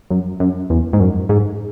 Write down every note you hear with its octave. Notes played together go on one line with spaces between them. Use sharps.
F#2
F#2
E2
G#2
F#2
G#2